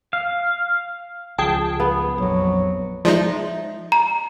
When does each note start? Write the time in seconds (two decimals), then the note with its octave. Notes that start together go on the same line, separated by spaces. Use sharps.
0.13 F5
1.38 C#2 F3 G#4 G5 A5
1.80 B3
2.18 A#1 F2 F#3
3.05 F3 G#3 D#4 D5 E5
3.92 A#5